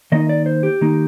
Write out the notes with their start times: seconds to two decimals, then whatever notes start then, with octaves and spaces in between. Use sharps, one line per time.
0.12 D#3 A#3 D#4 D#5
0.29 D5
0.46 C5
0.63 G4
0.81 D#3 A#3 D#4